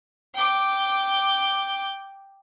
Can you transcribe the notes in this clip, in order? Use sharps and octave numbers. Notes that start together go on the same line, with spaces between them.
G5 D6